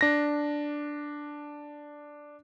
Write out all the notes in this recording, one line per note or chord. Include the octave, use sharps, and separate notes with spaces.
D4 A#6